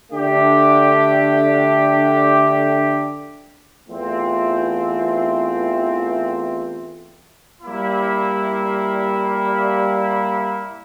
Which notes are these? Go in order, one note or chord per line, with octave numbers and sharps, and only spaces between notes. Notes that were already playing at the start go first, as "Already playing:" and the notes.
D3 A3 D4 G4
E2 E3 A3 C4 F4
G3 A#3 E4